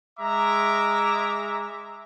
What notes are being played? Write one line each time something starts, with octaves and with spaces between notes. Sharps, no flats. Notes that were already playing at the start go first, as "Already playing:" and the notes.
G#3 E5 A#5 D6